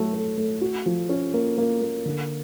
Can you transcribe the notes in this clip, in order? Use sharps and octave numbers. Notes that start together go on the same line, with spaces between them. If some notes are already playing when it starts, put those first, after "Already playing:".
Already playing: F#3 A3
A3
A3
F#4
F3
C#4
A#3
A#3
A#3
D3